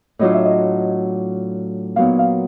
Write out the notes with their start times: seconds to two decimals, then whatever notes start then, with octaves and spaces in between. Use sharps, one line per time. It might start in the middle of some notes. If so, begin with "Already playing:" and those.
0.19 A2 F#3 A3 D4 F4 D#5
0.34 E5
0.45 D#5
1.96 A#2 F#3 B3 D#4 F5
2.19 F5